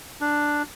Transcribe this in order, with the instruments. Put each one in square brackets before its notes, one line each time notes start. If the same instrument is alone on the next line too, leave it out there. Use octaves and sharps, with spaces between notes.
[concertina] D4